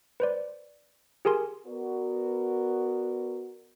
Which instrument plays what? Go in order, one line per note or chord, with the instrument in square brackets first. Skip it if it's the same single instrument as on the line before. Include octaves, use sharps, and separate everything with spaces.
[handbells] B4 C5 D5
G4 G#4 A#4 G#5 C6
[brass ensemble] B3 F#4 A#4 D5